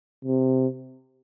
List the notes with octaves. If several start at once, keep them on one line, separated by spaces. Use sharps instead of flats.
C3